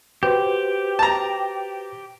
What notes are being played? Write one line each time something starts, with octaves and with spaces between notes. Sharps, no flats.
F#4 G4 B4 C5
A5 A#5